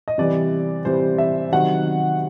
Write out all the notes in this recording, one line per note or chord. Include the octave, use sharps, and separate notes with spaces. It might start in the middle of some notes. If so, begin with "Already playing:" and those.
D#5
C3 E3 G3 D5
C3 E3 G3 C5
E5
C3 D#3 F#3 F#5